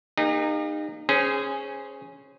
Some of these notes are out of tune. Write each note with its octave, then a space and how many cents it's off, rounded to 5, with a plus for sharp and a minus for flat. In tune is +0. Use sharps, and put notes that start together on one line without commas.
A#3 +0 D#4 -25 G4 +45
C#4 -10 G#4 +0 C5 -25